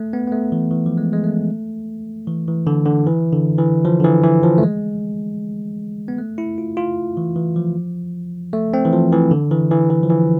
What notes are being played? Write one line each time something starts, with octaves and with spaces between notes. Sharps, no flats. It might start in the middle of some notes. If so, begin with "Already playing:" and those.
Already playing: A3
B3
B3
A3
E3
E3
F3
G#3
G#3
A3
E3
E3
D3
D3
E3
D3
E3
F3
D3
E3
E3
F3
A3
G#3
B3
A3
E4
F4
F4
E3
E3
F3
A3
C4
E3
F3
E3
D3
E3
E3
E3
F3
E3